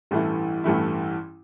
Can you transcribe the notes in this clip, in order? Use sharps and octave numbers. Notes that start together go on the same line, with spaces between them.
A1 G2 E3 A3 E4
A1 G2 E3 A3 E4